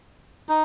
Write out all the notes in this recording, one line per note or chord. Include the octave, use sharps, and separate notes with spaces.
D#4